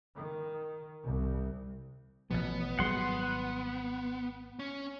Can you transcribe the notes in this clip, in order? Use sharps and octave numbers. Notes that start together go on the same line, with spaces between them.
D#3
C2
A1 B2 F3 B3
G#1 F#3 G3 F#5 C6
C#4